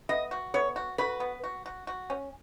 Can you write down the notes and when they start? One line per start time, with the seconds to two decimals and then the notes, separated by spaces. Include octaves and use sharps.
0.09 B3 D#5
0.31 F#4
0.54 B3 C#5
0.76 F#4
0.98 F#4 B4
1.20 B3
1.44 F#4
1.66 F#4
1.87 F#4
2.10 C#4